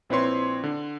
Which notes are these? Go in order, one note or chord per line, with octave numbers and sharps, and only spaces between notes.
A#1 C4 E4 B4 C#5 C6
D3